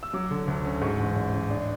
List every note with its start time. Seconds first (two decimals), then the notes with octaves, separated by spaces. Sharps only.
0.03 E6
0.13 F#3 D6
0.31 D3
0.47 D2
0.65 C#4
0.81 G#2 C#6
0.99 A1
1.16 A1
1.33 A1
1.50 D4